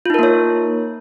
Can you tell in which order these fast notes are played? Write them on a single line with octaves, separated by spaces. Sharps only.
F4 D#4 A#4 A#3 C#5